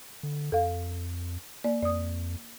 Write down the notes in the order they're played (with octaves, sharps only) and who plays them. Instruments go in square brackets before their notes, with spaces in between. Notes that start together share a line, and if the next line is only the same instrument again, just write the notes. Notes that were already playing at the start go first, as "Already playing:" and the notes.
[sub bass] D3
[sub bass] F2 [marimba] A4 F5
[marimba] A#3 D5
[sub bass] F2 [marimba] D5 D#6